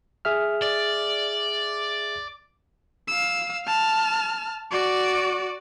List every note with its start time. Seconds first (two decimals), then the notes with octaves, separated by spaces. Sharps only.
0.25 G#4 E5 F6
0.62 D5
3.08 F5 E6
3.66 A5 F6
4.71 F#4 D5